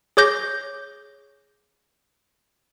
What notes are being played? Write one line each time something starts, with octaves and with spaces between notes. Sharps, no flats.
G#4 C#5 D6 G6 A#6